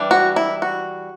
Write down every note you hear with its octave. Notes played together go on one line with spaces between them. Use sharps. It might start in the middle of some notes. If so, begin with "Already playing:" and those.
Already playing: E3 G3 D4
F#4
E4
F#4